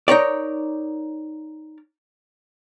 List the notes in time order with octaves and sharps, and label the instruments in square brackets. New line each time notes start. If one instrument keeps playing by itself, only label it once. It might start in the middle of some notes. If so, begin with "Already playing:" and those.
[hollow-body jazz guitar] D#4 A#4 C#5 D5